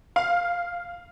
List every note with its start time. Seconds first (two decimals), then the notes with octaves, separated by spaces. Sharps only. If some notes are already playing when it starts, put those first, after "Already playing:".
0.16 F5